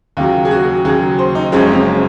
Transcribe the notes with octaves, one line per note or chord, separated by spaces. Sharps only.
D#2 C#3 F#3 F4
G#4
F#4
D#2 C#3 F#3 G#4
C5
D#4
F#1 F#2 F3 G#3 C#4
C4
C#4